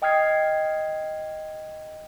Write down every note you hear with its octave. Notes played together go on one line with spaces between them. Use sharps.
D#5 G5 D#6 F6 G#6 C7